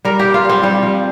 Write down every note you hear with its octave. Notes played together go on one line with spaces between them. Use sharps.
G3 A#4
G4
G3
F4
G3 C4
F3 G3
F3